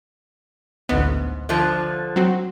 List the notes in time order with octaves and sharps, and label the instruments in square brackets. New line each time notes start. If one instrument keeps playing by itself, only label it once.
[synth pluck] A1 D2 B3 [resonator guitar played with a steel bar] G#2
[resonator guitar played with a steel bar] D3 F3
[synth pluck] F#3 C4 F#4